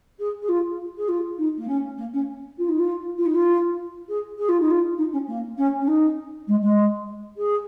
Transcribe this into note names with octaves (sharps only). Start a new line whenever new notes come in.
G#4
G#4
F4
G#4
F4
D#4
A#3
C#4
A#3
C#4
F4
D#4
F4
F4
D#4
F4
G#4
G#4
F4
D#4
F4
D#4
C#4
A#3
C#4
C#4
D#4
G#3
G#3
G#4